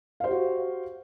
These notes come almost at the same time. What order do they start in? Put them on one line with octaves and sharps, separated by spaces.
F5 C5 G4 F#4